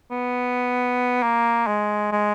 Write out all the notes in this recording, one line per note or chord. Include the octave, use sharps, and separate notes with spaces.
B3
A#3
G#3
G#3